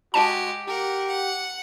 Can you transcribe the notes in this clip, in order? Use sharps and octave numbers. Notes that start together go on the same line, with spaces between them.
G#3 F#4 G4 A5
G4 A#4 F#5
F#5